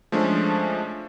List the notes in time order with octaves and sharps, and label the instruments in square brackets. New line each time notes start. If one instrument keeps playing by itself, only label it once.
[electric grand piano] F3 G#3 A3 C#4 D4